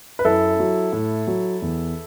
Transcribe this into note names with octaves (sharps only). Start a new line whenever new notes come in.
B4
F#2 E4 A4
F#3
A2
F#3
E2